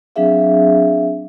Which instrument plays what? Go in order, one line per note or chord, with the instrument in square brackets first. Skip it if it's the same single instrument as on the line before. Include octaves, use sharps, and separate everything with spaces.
[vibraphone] F#3 C4 D4 G#4 E5 F5